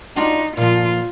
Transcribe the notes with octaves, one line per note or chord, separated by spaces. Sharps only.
D4 D#4 F4 F#4
A#2 F3 F4